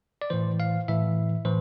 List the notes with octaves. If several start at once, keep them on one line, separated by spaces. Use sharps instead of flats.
D5
A2 E3 C5
F5
A2 E3 E5
A2 E3 C5